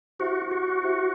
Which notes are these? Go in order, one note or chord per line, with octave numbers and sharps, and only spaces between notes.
E4 F#4 G4 C5 E5
F#4
E4 G4 C5 E5